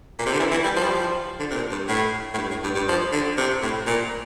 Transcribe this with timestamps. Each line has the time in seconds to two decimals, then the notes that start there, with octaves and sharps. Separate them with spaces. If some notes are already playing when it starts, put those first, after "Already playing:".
0.19 A#2
0.26 C3
0.33 D3
0.40 E3
0.51 E3
0.63 G3
0.76 F3
0.83 G3
0.90 F3
1.39 D3
1.50 C3
1.56 A#2
1.71 G2
1.88 A2
2.34 A2
2.37 G2
2.50 A2
2.64 G2
2.75 G2
2.88 F3
3.12 D3
3.37 C3
3.62 A2
3.87 A#2